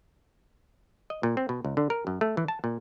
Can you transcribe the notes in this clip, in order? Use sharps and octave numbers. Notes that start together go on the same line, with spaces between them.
D#5
A#2
C4
B2
C#2
D3
A#4
F#2
A3
E3
A5
A#2